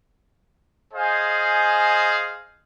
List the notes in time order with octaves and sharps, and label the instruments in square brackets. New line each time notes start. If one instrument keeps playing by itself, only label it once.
[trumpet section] G#4 C5 D#5 F5 G#5